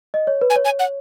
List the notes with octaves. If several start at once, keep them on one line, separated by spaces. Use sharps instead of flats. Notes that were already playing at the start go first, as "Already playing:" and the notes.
D#5
C#5
B4
G#5
C#5
G#5
F#5